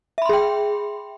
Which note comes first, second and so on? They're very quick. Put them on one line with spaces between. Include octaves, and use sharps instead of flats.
E5 B5 C6 G#4 G5